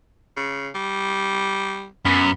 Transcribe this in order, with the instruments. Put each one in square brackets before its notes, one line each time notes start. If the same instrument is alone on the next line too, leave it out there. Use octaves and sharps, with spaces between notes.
[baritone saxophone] C#3
G3
[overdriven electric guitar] F#2 [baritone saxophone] B3